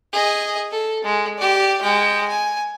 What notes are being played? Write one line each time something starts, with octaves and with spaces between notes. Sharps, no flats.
G#4 D#5
A4
G#3
G4 D5
G#3 G5
G#5